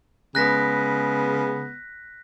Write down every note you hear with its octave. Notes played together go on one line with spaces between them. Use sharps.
C#3 G#3 B3 F#6 A#6 B6